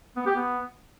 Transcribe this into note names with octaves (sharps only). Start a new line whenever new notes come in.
B3
G4
B3